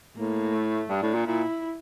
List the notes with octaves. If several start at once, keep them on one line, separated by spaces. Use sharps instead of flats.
A2 A#3
A3
G2 D4
A2
A#2
A#2 E4